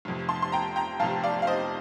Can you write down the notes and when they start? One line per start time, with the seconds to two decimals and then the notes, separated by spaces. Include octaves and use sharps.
0.05 F1 F2 C3
0.29 A5 C6
0.42 C6
0.52 G5 A#5
0.76 G5 A#5
1.00 F1 F2 C3 F5 A5
1.24 D5 F5
1.42 F5
1.47 C5 D#5